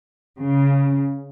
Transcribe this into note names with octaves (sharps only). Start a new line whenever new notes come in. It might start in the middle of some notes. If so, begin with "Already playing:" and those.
C#3